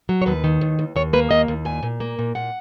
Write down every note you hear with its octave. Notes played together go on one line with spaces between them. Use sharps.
F#3
C#5
D#2 B4
D#3
D#2
D#2
D#2 C#5
A#3 B4
D#2 D#5
D#2
A#2 G#5
A#2
A#3
A#2
A#2 F#5